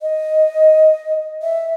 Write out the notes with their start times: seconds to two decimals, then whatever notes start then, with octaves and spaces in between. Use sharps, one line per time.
0.02 D#5
1.42 E5